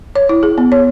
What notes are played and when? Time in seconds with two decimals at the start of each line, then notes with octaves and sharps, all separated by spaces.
0.16 C#5
0.29 E4
0.43 G#4
0.58 B3
0.72 C#5